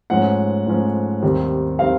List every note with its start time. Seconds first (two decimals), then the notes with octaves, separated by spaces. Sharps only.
0.10 G#2 F3 A3 C#4 F#5
0.66 G#2 F3 A3 C#4
1.22 D#2 D#3 G3 C4
1.79 D#3 G3 C4 F5